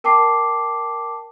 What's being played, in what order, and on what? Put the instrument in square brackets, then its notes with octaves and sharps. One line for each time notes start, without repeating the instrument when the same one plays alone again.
[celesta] A#4 G5 A5 D6 C7